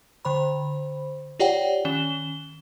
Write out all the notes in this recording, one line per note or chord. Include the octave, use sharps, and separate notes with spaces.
D3 C5 B5
F4 G4 C#5 D5 F#5 G5
D#3 C#4 E7 G7